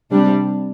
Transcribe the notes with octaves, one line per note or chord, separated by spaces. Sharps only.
C3 G3 D4